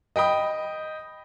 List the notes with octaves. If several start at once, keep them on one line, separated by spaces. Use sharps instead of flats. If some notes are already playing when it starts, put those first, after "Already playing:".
D#5 G5 B5 D#6